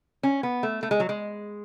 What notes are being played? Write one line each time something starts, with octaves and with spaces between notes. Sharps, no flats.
C#4
B3
A3
A3
G#3
F#3
G#3